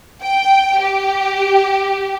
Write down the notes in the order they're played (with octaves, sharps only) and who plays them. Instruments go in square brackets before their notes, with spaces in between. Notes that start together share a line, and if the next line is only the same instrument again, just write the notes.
[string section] G5
G4